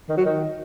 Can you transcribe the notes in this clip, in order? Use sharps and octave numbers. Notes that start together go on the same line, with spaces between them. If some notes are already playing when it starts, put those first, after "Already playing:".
D#3
F#3
D#3